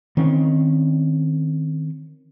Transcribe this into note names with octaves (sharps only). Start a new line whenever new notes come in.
D#3 C4 C#4